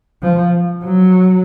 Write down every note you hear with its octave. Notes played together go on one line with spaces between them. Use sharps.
F3
F#3